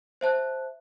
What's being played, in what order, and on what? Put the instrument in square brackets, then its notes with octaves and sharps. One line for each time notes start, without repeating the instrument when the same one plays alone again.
[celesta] C5 E5 A5 F#6